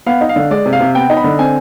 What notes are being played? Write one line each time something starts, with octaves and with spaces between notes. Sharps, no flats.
B3 F5
D#4
F5
D3
G#3 D5
C3
F5
C3
B3 G5
D#4
B5
D3
C4 G#5